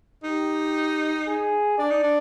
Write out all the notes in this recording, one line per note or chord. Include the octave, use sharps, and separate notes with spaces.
D#4 G4
G#4
D4 D5
D#4
D4